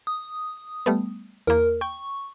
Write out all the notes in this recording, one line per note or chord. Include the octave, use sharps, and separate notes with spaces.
D#6
G3 A3 B3
E2 A#3 A#4
G5 C#6